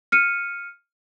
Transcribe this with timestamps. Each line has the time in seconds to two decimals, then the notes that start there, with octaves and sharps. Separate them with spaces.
0.12 F6 C#7 D#7